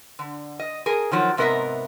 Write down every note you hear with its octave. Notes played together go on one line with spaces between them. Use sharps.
D3
D#5
G#4 A#4
D#3 F3 F#3
G#2 C3 B3 A#4 D#5 E5